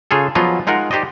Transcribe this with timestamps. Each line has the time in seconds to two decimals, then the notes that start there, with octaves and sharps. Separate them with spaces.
0.11 C#3 F4 G#4 A4
0.35 F3 F#3 B3 F4 G#4 D#5
0.67 G#3 D#4 F4 A#4 F#5
0.91 D#4 G4 C5 D5 D#5